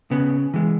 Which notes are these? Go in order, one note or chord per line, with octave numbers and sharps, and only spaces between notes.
C#3 B3
E3 G#3